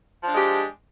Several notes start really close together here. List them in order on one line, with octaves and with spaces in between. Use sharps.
F3 D4 G#3 G4